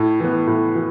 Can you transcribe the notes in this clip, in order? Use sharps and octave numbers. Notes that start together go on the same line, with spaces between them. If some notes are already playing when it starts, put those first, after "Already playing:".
Already playing: A2
E3 B3
A2
E3